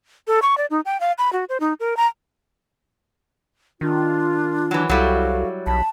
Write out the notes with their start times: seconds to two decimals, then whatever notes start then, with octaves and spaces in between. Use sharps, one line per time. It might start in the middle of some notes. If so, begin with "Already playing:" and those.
0.27 A4
0.42 C#6
0.58 D5
0.70 D#4
0.85 G5
1.00 F5
1.18 B5
1.33 F#4
1.49 C5
1.60 D#4
1.80 A#4
1.97 A#5
3.81 D#3 D4 F4
4.71 E3 F#3
4.89 C2 F#3 G3 E4 F#4 A4 F5
5.67 B1 A5 B5